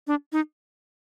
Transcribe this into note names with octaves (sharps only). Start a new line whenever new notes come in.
D4
D#4